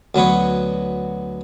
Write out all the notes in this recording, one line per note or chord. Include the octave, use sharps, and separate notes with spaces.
D2 F#3 B3 B4 C#5